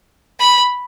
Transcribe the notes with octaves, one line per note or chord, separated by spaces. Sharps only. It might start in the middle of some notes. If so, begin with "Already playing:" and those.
B5